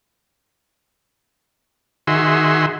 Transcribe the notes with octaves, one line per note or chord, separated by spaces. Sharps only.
D#3 F#4 G#4 E5 C6